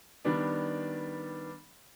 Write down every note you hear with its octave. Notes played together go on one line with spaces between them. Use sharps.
D#3 G3 B3 D4